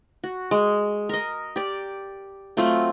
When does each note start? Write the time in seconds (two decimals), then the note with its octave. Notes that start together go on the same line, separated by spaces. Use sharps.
0.24 F#4
0.51 G#3
1.09 A#4 D#5
1.56 G4 D5
2.57 F#3 A3 C4 F4